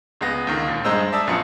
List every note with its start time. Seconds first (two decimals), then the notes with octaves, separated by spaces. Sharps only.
0.21 C#2 G#3 B3 A#6
0.47 C#2 D3 D#3 A#3
0.68 D#2 A#2
0.84 G2 G#3 C5 D#5 A#5 E6
1.12 D5 E5 A5 D#6 E6
1.27 A#1 F#2 F#3 B3 F4 C#7